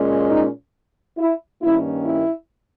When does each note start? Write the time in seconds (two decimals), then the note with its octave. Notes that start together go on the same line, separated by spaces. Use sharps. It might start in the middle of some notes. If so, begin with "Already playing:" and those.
Already playing: A#2 G#3 C#4
0.30 D#4
1.18 E4
1.61 G2 D#3 A#3 C#4 E4
2.05 E4